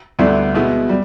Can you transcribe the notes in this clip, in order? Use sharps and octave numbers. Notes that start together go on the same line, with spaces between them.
D2 D3 G3 B3 E4
B2 G#3 B3 E4
G3